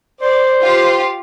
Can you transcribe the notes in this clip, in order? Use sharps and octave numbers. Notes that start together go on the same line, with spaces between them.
C5 D5
F4 G4